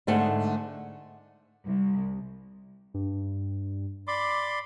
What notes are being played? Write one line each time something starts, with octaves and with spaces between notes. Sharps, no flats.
G#2 D3 A3 G#4 C5 F#5
C2
G2
D5 B5 C6 D6